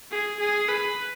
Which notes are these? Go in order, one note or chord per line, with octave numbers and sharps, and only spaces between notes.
G#4
G#4
B4